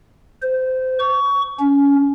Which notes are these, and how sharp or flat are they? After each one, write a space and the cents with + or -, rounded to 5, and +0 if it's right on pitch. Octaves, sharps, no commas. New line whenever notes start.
C5 -20
C#6 +25
C#4 +25